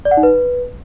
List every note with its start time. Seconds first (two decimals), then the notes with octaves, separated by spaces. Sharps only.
0.05 D5
0.11 F#5
0.17 D#4
0.23 B4